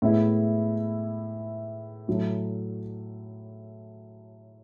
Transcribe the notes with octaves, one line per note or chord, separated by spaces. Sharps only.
A2 G#3 B3 E4
A2 F#3 A3